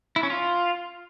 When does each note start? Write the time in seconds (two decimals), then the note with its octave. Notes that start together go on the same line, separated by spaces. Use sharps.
0.16 E4
0.23 C#4
0.30 F4